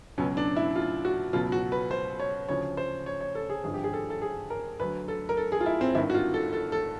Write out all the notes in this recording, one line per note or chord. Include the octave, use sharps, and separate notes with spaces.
C#2 B2 F#3 C#4
D4
E4
F4
F#4
C#2 B2 F#3 F4
F#4
B4
C5
C#5
D2 C#3 F3 C#5
C5
C#5
C#5
A4
G#4
G#1 G2 D3 F3 G#4
G4
G#4
A4
A4
G#4
A#4
D2 D3 F#3 B4
A4
A#4
A4
G#4
F4
E4
C4
G#1 G2 D#3 E4
F#4
F4
A4
A4
A4